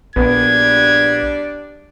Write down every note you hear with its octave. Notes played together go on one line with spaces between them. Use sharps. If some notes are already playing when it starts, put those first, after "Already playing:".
A#1 G3 B3 D4 G#6